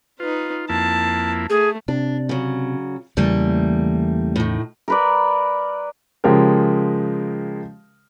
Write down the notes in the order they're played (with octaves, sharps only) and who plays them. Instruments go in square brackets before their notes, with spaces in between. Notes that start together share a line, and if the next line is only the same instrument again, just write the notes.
[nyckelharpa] D#4 B4 [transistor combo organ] F4
[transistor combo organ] F2 A#3 E4 [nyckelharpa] A5
[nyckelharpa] A3 [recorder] G#4
[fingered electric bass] C3 [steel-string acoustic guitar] D4
[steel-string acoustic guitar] C#3 F#3
[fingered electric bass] E2 C#3 E3 [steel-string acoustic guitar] G3 A3 A#3
[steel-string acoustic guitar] A2 D#3
[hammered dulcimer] A#4 B4 D5
[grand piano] C#3 F3 G#3 G4 A#4